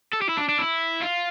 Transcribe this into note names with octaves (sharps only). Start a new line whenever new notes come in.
A4
G4
E4
D4
D4
E4
F4